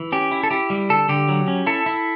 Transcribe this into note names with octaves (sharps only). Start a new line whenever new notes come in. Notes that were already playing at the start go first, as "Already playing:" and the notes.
Already playing: E3
C#4 G4
E4
A4
E4 G4
G3
D3 A4
D3 G4
F#3
C#4
E4 A4
E4